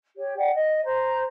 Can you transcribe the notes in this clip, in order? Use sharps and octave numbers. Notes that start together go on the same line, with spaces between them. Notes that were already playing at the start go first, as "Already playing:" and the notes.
G4 C#5
D5 F#5 G5
D#5
C5 A#5